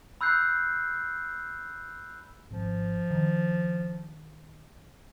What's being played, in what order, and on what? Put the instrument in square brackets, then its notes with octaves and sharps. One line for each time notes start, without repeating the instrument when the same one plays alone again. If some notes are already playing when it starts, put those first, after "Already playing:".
[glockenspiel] B5 E6 F#6 G6 C7
[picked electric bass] G#1 [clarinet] F3
[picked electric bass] D#3